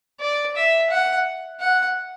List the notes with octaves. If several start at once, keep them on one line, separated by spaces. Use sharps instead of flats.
D5
E5
F#5
F#5